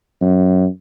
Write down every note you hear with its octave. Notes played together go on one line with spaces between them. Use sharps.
F#2